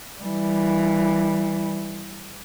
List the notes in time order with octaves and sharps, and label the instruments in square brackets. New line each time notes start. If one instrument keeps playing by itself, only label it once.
[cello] E3 G3